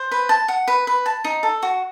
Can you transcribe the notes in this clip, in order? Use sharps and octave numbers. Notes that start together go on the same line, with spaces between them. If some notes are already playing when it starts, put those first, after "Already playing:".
Already playing: C5
B4
A5
F#5
B4
B4
A5
D#4
A4
F#4